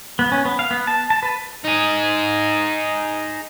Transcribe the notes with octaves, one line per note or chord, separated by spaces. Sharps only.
B3
C#4
B3
F5
B3
A5
A5
B4
D#4 G#4